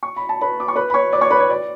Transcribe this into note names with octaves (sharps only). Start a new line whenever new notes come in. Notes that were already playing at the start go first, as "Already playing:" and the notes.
C#6
B5
A5
B4 B5
D6
C#6
B4 B5
B5
C#5 C#6
D5 D6
C#5 C#6
B4 B5
C#5
D5